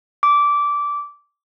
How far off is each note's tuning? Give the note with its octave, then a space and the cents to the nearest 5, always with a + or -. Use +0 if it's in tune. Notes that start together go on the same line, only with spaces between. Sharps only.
D6 -15